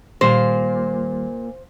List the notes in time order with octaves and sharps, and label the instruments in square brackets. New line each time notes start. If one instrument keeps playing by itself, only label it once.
[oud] A#2 [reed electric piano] D#3 G3 [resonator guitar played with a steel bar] C5